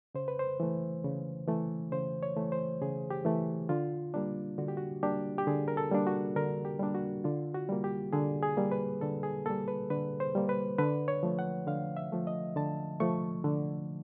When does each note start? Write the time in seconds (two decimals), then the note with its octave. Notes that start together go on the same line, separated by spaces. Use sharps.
0.15 C#3 C5
0.28 B4
0.39 C5
0.60 E3 A3
1.04 C#3
1.48 E3 A3
1.92 C#3 C5
2.23 C#5
2.36 E3 A3
2.52 C5
2.81 C#3 G#4
3.10 G4
3.25 E3 A3
3.69 D3 F4
4.14 G3 A#3 D4
4.58 D3 F#4
4.68 G4
4.77 F#4
5.03 G3 A#3 D4 G4
5.38 G4
5.47 D3 G#4
5.68 A#4
5.77 A4
5.92 G3 A#3 D4
6.07 F#4
6.36 D3 A#4
6.65 G4
6.79 G3 A#3 D4
6.94 F#4
7.24 D3 F4
7.55 F#4
7.69 G3 A#3
7.84 G4
8.13 D3 G#4
8.43 G#4
8.57 G3 A#3
8.72 B4
9.01 D3 A4
9.23 G#4
9.46 G3 A#3 A4
9.68 B4
9.90 D3 B4
10.20 C5
10.35 G3 A#3
10.49 B4
10.78 D3 B4
11.08 C#5
11.23 F3 A3
11.39 F#5
11.67 D3 F5
11.97 E5
12.12 F3 A3
12.27 D#5
12.56 D3 A5
13.00 F3 A3 C#6
13.44 D3